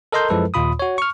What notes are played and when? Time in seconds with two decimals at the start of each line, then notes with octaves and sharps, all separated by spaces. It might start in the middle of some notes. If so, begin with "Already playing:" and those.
0.12 A4 A#4 D#5 A#5 C6 G6
0.30 F#2 F3 G#3 E4 A4 B4
0.54 D#2 A#2 F4 B5 D#6
0.79 F#4 C#5
0.98 C#6 F6